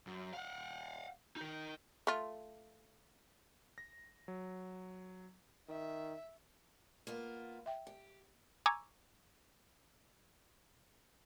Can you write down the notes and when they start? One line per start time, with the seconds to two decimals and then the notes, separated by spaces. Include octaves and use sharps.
0.07 F#2
0.34 F5 F#5
1.36 D#4 A#4
2.07 A3 F4
3.78 A#6
4.28 F#3
5.69 D#3 E5
7.07 A#3 B3 F4
7.66 E5 G5
7.87 G4
8.66 G#5 A#5 C#6 D6 E6 G#6